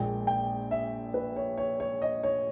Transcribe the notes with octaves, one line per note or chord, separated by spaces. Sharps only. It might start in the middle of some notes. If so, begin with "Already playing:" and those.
Already playing: A#1 A#2 G#3 G5
G5
E5
B4
C#5
C#5
C#5
D#5
C#5